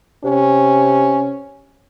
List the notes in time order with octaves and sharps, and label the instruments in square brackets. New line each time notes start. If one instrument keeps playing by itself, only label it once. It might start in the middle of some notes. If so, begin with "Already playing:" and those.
[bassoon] C3 [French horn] C#4